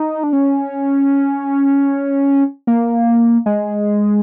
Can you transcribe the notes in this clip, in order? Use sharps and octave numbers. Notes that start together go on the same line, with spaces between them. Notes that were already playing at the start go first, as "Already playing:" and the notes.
Already playing: D#4
D4
C#4
A#3
G#3